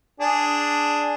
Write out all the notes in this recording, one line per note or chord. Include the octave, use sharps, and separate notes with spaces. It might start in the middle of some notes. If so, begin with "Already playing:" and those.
D4 G#4